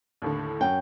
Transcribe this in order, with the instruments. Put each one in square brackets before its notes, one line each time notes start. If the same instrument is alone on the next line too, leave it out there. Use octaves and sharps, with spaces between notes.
[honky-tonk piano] D#2 A2 D3
[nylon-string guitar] F#2 G5